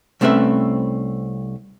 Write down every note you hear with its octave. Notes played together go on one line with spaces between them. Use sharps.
C2 A3 C4 C#4 B4 E5